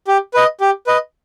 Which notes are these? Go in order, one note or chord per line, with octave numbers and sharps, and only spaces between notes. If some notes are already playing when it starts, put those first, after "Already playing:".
G4
B4 D#5
G4
B4 D#5